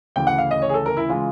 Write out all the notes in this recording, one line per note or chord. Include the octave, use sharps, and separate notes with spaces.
D2 C#3 E3 G5
F#5
F5
D#5
C#5
G#4
A4
A#4
E4
C#3 E3 G#3 F4